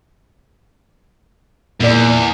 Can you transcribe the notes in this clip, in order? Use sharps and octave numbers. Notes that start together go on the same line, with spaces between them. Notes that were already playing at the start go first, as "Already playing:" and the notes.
E2 A#2 A#3 D5